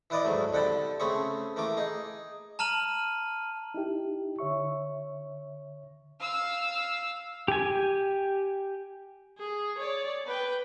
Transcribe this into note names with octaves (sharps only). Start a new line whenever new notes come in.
E3 E4 B4 D5 D#5 D6
D2 G#2 F#3 A3
C2 D3 F#5 G5 A5 B5
C#3 A3 C4 G#4 B5 C#6
E3 A3 A#3 D6
D#4 G#4
A5 A#5 F6 D#7 F#7
D#4 E4 G4
D3 C#5 E5 C#6
F5 E6
G4 G#5
G#4
C#5 D5
B4 G5